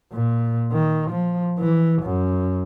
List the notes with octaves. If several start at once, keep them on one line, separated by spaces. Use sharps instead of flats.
A#2
D#3
F3
E3
F#2